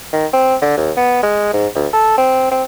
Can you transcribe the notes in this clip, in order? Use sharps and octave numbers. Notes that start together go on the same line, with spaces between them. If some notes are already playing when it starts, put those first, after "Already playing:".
D#3
C4
D3
D#2
B3
G#3
G#2
D2
A4
C4
C4